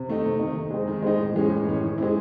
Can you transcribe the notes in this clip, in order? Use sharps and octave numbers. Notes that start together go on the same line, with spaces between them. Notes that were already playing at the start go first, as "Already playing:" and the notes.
Already playing: C3
D#3 A3 D#4
C3
D#3 A3 D#4
D#3
G#3 C4 D#4
D#3
G#3 C4 D#4
A2
E3 G#3 C#4
A2
E3 G#3 C#4
D#3
G#3 C4 E4